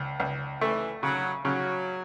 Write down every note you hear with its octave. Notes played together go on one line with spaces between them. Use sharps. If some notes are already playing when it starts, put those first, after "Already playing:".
Already playing: C#2
C#2
E3 A3
C#3 F#3
C#3 F#3